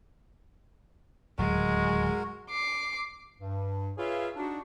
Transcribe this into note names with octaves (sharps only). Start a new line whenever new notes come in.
D1 D#2 F#3 G#3 F#4 A#4
D6 C7
G2
F4 G#4 B4 C#5 E5 F5
D4 D#4 F#4